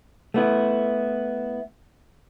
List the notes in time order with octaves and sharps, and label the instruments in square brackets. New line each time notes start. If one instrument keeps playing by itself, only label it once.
[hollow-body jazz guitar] A3 B3 E4